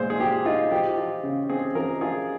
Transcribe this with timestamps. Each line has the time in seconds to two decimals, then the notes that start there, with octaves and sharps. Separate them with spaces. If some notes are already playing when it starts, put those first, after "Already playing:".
Already playing: A#2 G#3 G#4 C5
0.10 G#4
0.20 F3 G4
0.45 D#4 F4
0.71 F3 G4
0.97 F4
1.23 C#3
1.50 C4 G#4
1.75 F3 A#4
2.01 F4 G#4